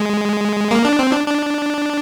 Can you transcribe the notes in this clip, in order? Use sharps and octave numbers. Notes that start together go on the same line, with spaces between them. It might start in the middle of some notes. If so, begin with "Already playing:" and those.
Already playing: G#3
A#3
D4
C4
D4
D4